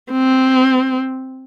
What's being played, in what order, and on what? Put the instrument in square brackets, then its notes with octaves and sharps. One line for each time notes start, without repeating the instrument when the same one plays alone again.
[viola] C4